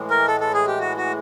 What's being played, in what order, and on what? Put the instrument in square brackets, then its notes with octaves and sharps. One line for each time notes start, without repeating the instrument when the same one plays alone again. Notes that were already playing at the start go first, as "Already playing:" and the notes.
Already playing: [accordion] A2 E3 G#3
[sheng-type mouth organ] A#4
A4
A4
G#4
G4
F#4
F#4